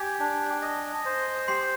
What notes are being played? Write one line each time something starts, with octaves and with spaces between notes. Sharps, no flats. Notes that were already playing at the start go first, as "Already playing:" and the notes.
Already playing: G4 G#5 G#6
D4
D#5
C5
G4 C6 C7